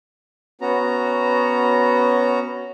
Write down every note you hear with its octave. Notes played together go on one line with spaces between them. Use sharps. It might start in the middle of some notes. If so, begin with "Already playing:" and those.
B3 C#4 F#4 A#5